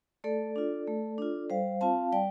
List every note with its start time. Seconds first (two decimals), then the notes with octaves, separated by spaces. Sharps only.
0.24 A3 A4 D5
0.56 D4 F4
0.87 A3
1.18 D4 F4
1.50 G3 C5 F5
1.81 C4 F4 F5 A5
2.12 G3 D5 G5